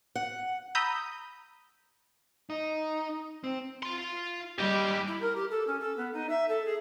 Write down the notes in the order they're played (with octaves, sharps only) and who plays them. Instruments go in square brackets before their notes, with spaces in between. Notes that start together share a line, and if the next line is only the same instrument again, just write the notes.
[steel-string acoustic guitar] F#5
[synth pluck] A#5 B5 D#6 E6 G6
[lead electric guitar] D#4
C4
[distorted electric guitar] F4 C6
[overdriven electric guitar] D#2 G#3 [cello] G3 [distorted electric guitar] G4
[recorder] E4
A#4
G4
A4
C#4
A4
B3
D#4
E5
A4
G#4